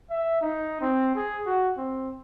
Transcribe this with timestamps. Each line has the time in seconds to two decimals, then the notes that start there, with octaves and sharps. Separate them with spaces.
0.10 E5
0.41 D#4
0.81 C4
1.15 G#4
1.46 F#4
1.77 C4